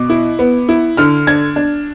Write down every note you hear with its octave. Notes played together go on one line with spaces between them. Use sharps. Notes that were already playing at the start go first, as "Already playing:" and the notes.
Already playing: B2 D6
E4
B3
E4
D3 F6
D4 G#6
D4